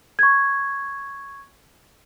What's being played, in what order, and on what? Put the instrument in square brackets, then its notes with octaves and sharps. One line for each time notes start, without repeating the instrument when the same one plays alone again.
[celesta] C#6 G#6